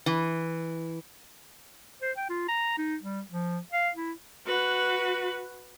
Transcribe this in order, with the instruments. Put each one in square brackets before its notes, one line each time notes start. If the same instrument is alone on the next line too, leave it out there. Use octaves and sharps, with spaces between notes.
[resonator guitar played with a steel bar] E3
[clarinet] C5
G5
F4
A#5
D#4
G3
F3
F5
E4
[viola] F#4 B4